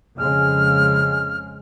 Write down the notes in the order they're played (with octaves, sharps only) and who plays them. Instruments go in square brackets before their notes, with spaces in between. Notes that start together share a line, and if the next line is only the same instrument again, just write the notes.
[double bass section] F2 C#3 G#3 [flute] F6